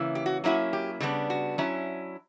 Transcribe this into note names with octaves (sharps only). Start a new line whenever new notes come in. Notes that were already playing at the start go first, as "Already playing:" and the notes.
Already playing: C#3 E3 A#3 C#4 E4
G4
F#4
F#3 A#3 C#4 E4 F#4
G4
C#3 G3 B3 D4
F#4
F#3 C#4 E4